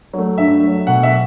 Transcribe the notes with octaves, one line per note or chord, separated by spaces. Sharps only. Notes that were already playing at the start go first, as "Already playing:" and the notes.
F#3 A3
G2 E5
F#3 A3
B2 F#5
E5